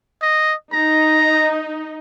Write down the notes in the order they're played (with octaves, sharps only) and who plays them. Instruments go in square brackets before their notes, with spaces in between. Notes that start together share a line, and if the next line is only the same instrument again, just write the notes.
[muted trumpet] D#5
[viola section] D#4 [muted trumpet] A#5